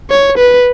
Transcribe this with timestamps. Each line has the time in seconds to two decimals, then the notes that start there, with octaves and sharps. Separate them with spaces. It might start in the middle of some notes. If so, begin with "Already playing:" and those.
0.10 C#5
0.38 B4